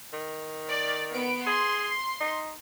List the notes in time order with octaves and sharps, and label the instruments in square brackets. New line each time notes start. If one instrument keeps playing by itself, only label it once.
[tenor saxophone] D#3
[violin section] D5
B3 D7
[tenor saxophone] G#4 [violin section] C6
[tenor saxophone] D#4